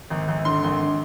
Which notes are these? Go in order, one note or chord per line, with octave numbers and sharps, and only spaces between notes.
G#1
G#1
D3 C6
G#1